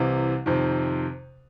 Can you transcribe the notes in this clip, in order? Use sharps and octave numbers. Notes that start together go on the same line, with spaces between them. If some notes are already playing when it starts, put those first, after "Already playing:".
Already playing: C2 C3 E3
F2 C3 D#3